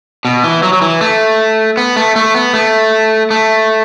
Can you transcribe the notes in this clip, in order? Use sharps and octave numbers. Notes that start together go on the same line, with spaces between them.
B2
E3
F#3
F#3
E3
A3
B3
A3
A3
B3
A3
A3